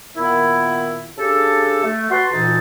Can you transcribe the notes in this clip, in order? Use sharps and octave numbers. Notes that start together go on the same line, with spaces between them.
A#2 D#3 B3 E4
C#3 D4 G4 A4
A3
F#4 B4 F#5 A5 C6
D2 A#2 E3 D#4 A4 A5